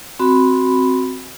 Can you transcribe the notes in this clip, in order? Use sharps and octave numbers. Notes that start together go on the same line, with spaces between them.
C4 F#4 B5